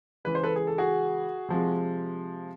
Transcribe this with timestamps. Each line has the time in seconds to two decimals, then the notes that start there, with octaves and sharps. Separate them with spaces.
0.25 C#3 E3 G#3 B4
0.35 C5
0.43 A4 B4
0.56 G#4
0.67 A4
0.78 F#4 G#4
1.49 C3 F3 G#3